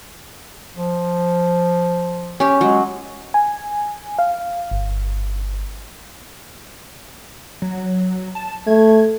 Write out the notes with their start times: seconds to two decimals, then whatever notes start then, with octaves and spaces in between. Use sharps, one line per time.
0.77 F3
2.40 C#4 G4
2.61 F#3 G#3
3.34 G#5
4.19 F5
4.71 G1
7.62 F#3
8.35 A5
8.67 A3 G#6